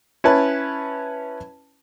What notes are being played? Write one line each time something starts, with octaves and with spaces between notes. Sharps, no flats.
C#4 E4 B4 A5